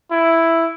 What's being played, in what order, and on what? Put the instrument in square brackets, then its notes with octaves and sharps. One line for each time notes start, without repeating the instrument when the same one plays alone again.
[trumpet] E4